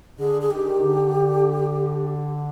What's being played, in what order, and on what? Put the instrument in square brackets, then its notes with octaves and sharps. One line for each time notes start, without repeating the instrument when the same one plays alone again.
[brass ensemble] D3 [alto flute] G#4
[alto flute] G#4
[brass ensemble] D#3 [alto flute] G4
[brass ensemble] D3